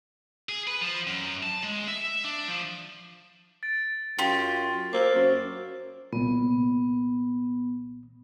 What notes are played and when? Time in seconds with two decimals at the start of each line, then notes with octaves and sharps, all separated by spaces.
0.49 G#4
0.67 B4
0.81 F3
1.07 F#2
1.43 A5
1.63 G#3
1.88 E5
2.25 D4
2.48 F3
3.63 A6 D7
4.19 F#2 F4 G4
4.93 A#3 C5 D6 E6 F6
5.15 F#2
6.13 C2 A#2 B3